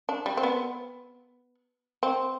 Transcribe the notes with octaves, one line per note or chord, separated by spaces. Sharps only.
D4
G3
C4
B3
C4